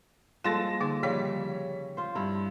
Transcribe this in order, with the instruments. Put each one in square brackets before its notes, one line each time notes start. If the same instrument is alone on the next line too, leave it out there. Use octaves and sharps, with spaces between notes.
[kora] F3 G#3 A4 [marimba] G3 A#3 [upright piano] A6 A#6 E7
[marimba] D3 A#3 D#4 [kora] G#4
[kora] C#3 G3 [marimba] F3 F5 [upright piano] C#5 B6
[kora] F4 C5
[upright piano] G2 [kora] E4